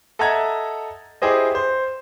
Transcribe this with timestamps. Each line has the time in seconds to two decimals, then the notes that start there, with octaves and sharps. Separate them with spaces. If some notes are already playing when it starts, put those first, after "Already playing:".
0.19 A4 D#5 E5 F#5 A#5 G#6
1.22 E4 G4 G#4 C5 D#5
1.55 C5